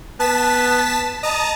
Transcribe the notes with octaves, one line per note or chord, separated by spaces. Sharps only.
B3 A5 B6 E7
D#5 A5 A#5